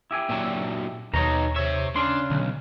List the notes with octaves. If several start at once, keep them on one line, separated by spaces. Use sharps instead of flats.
E4 G4 G#5
A#2 F#3
D#2 B2 D#4 C#5 A#5
C3 C#5 E5
C#3 C#4 D4 C6
B1 D3